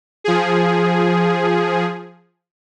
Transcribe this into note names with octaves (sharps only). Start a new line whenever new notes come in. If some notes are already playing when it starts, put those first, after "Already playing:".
F3 G#4